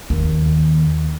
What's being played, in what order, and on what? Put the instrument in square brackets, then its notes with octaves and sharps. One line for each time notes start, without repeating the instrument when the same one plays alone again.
[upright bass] D#2